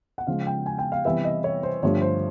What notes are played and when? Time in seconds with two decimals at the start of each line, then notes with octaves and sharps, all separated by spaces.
0.18 F#5
0.27 C#3 F3 G#3 F5
0.47 G5
0.66 G#5
0.78 G5
0.92 F5
1.05 C3 E3 G3 B3 E5
1.24 D#5
1.44 C#5
1.63 C5
1.83 G2 D3 F3 A3 C#5
2.02 C5